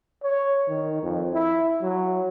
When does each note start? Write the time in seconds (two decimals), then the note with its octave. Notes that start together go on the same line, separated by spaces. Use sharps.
0.23 C#5
0.68 D#3
1.03 F2
1.34 E4
1.82 F#3